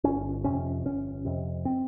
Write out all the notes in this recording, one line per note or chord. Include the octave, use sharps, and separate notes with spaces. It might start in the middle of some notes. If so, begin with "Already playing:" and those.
G1 C#4
F2 C3 C#4
G1 C#4
F2 C3
C4